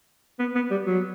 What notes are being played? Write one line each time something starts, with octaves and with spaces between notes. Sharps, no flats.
B3
B3
G3
F#3